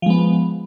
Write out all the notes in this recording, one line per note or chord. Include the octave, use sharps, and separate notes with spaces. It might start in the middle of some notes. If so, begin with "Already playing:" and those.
F3 G#3 B3